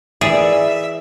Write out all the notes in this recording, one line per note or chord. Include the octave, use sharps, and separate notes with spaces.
E3 G#4 A#4 D5 E5